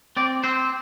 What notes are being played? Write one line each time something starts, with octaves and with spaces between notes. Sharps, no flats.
C4 D5
C4 C5